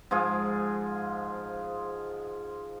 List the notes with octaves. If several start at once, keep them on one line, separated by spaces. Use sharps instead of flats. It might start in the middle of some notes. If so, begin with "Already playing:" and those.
G#2 F3 F4 G#4